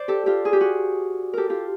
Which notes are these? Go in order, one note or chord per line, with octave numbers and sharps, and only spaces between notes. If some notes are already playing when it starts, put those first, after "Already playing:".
Already playing: C5 D5
G4 A4
F4 G4
G#4
G4
F#4 G#4
G4 A4 A#4
F4 G4